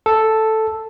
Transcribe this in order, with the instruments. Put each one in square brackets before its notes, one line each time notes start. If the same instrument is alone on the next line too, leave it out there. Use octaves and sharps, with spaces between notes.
[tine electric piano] A4